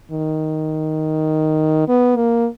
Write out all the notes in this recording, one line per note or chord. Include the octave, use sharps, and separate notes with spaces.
D#3
B3
A#3